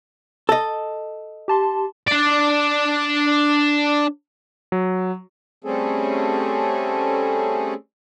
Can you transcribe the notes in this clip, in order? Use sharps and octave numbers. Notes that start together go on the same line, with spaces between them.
A4 D#5
G4 A5 C6
D4 D5
F#3
G3 A3 C4 C#4 G#4 A4